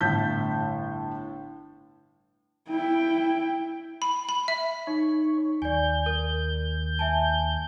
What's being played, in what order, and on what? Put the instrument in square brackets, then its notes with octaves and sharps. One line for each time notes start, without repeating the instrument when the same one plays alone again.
[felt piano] G1 A2 A5 G6 B6
[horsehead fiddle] E4 G5
[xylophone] B5
B5
E5
[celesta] D#4 [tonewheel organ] C#5
[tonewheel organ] D#2 G6 [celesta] D5 G#5
[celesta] A#4
E5 G#5 A5